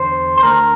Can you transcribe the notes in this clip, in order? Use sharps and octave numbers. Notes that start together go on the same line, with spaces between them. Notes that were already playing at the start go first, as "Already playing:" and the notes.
Already playing: E2 D3 C5
C5
D2 D3 A#4